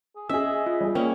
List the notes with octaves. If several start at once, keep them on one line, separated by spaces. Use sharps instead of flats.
G#4
C#4 G#4 D#5 E5 E6
F4
G3 G#4
A#3 C#4 C#5 G5